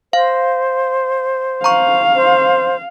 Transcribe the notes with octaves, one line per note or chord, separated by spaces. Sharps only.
C5 F5
F5 A#5 C#6
C5